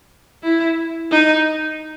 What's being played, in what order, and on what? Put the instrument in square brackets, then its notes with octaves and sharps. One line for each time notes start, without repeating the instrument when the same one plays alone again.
[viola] E4
D#4